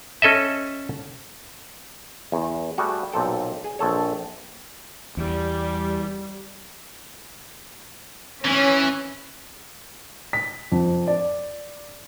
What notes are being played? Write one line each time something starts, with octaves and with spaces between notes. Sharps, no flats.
C#4 A4 D#5 E5
E2
G3 A3 F#4 G#4
B1 A#2 C4 A4 G5
G#4
A#1 C4 A4 C#5
E2 G3
E3 C#4
B6
F2
D5